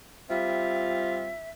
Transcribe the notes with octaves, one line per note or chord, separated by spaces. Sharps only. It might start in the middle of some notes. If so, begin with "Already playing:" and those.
G3 C4 F4 E5